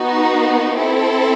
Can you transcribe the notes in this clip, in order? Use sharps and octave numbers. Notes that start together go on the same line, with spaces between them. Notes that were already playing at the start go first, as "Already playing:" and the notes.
Already playing: B3 D#4 F#4
C4 E4 A4